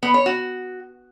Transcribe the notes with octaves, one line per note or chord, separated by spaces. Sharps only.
B3
C#5
F#4